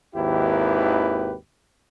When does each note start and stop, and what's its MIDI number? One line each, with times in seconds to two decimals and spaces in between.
0.15 1.33 32
0.15 1.33 39
0.15 1.33 64
0.15 1.33 67
0.15 1.33 71